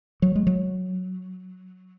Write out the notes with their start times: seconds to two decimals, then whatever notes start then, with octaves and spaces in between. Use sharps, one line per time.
0.22 F#3
0.35 G#3
0.47 F#3